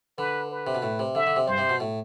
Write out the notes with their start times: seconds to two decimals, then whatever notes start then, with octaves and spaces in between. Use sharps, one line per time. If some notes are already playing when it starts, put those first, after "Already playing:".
0.18 D3 B4
0.51 B4
0.67 C3
0.75 B2
0.82 A2
0.99 C3
1.15 D3 E5
1.27 D3
1.36 C3
1.47 G2 C5
1.58 C3
1.69 B2
1.80 A2